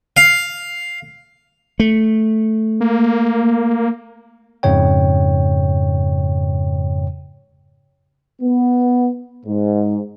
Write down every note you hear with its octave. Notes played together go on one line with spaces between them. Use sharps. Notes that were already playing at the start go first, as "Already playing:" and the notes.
F5
A3
A#3
F2 G#2 C#3 C#5 G5
B3
G#2